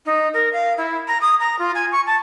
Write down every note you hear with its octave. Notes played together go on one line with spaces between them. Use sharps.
D#4
A#4
F5
E4
A#5
D#6
A#5
F4
G#5
C#6
A5